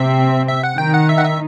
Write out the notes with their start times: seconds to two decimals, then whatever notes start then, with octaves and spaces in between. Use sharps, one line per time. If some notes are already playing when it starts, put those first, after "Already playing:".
Already playing: C3 C4 E5
0.48 E5
0.63 F#5
0.78 D#3 D#4 G5
0.94 F#5
1.09 E5
1.18 F#5
1.25 E5